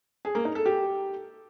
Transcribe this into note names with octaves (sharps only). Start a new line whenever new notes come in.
G#4
A#3
D#4
A4
G4